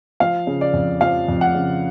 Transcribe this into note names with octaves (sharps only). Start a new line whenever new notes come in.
F3 F5
C#3
D5
F2
F3 F5
F2
F#5
C#3